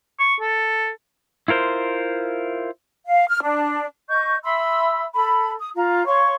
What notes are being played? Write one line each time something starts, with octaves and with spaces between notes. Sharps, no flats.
C#6
A4
E4 F4 A#4 C5
F5
F6
D4
D#5 C#6 G6
E5 B5 C6 E6
A4 B5
D#6
F4 A#5
C#5 F5 C6 C#6